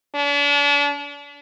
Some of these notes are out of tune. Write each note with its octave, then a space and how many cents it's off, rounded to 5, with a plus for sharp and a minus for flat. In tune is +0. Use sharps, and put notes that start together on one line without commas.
D4 -40